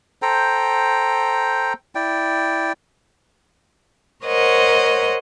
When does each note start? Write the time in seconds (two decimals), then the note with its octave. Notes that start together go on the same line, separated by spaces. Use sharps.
0.22 A4 C5 G5 A#5
1.95 E4 D5 G5
4.24 A#4 C5 C#5 D#5 F#5